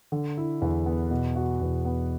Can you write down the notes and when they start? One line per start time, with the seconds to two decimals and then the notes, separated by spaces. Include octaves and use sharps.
0.12 D3
0.37 E4
0.62 E2
0.86 B3
1.11 B2
1.36 F#4
1.61 E2
1.85 B3